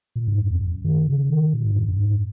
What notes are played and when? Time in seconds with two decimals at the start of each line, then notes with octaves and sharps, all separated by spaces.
0.16 A#2
0.28 G#2
0.39 F#2
0.51 E2
0.61 F#2
0.85 D#3
1.07 C#3
1.30 D#3
1.53 A#2
1.65 G#2
1.75 F#2
1.88 F#2
1.99 G#2